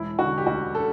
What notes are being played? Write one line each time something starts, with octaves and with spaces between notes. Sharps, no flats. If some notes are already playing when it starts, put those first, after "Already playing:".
Already playing: E1 E4
D3 F#4
G4
D2 F#4
A4